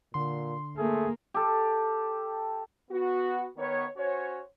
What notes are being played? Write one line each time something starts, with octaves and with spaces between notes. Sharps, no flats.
A#2 D3 C6
A3 A#3 G#4
G4 A4
B3 F#4
D#3 B3 C#5
C#4 F#4 C5 C#5